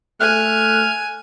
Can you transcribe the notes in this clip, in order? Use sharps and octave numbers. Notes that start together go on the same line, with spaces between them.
A3 G#5 F6 F#6